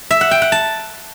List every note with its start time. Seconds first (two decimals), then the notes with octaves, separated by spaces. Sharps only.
0.11 E5
0.21 F#5
0.31 G5
0.42 F#5
0.52 A5